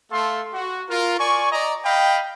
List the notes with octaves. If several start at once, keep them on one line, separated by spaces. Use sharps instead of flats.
A3 A4 F5 C6
F#4
F4 A#4
D5 G#5 C#6
D5 D#5 A#5
D#5 F5 G5 B5